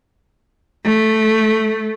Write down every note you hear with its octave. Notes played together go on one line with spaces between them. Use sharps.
A3